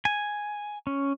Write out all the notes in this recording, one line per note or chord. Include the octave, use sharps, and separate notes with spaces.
G#5
C#4